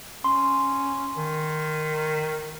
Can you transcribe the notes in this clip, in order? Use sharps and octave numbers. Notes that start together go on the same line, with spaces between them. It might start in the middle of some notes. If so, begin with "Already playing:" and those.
C#4 C6
D#3